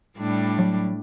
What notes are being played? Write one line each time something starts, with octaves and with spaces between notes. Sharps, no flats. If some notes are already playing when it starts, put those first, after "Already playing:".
A2 G3 D4
F#3